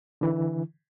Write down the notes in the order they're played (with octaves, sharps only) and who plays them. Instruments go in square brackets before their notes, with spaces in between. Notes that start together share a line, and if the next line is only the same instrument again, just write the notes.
[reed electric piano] D3 E3